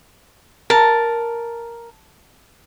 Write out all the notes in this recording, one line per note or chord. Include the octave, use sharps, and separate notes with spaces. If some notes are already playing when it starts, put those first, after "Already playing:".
A#4 A5